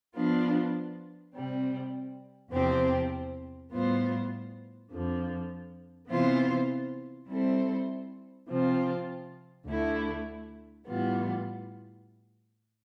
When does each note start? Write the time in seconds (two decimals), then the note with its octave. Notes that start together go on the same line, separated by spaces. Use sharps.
0.14 F3 B3 D4 F4
1.33 C3 G3 C4
2.52 E2 C3 F3 C4 G4
3.71 A2 G3 B3 F4 C5
4.91 F2 D3 F3
6.09 C3 E3 B3 F4 C5
7.29 G3 C4 E4 A4 C5
8.48 C3 F3 C4 F4
9.67 D2 D3 A3 E4
10.86 A2 E3 G3 B3 F4